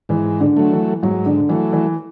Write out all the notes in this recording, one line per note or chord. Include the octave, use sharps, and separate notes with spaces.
G#2 E3
D3
F#3 A3
E3
G#2 F#3
D3
E3 F#3 A3
E3